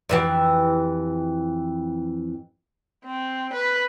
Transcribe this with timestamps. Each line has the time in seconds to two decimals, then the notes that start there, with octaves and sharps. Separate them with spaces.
0.09 F2 E3 G4
3.05 C4
3.53 B4